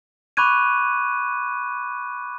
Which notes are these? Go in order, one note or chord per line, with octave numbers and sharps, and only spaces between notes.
B5 C#6 D6 F#6 G#6 D#7